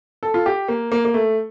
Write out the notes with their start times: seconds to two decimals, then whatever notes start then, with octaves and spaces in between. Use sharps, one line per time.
0.23 A4
0.34 F4
0.46 G4
0.68 A#3
0.92 A#3
1.05 A#3
1.14 A3